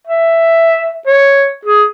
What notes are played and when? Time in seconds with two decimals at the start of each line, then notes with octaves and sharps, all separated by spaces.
0.07 E5
1.07 C#5
1.65 G#4